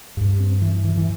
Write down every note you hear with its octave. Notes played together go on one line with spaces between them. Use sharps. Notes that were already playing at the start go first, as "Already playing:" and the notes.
G2
C4
E3
E3
E3